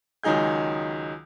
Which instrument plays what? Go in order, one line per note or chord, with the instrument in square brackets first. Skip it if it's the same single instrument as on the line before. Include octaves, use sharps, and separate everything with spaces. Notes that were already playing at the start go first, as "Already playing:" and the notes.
[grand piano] C#2 D#3 F#3 D#4 G#4 G6